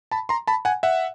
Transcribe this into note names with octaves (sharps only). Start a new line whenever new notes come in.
A5 B5
A#5 C6
A5 B5
F#5 G#5
E5 F#5